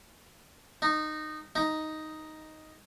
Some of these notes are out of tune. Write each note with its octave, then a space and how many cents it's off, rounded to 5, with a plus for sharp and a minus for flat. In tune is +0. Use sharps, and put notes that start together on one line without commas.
D#4 -15
D#4 +5